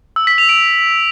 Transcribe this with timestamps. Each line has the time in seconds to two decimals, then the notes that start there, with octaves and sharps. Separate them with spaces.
0.16 E6
0.27 B6
0.38 F7
0.49 D7